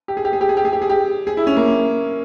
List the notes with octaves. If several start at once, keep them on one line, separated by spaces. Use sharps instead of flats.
G4
G#4
G4
G#4
G4
G#4
G4
G#4
G4
G#4
G4
G#4
E4
C#4
A#3